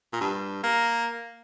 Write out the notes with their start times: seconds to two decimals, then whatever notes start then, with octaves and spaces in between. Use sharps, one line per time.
0.13 A#2
0.21 G2
0.63 A#3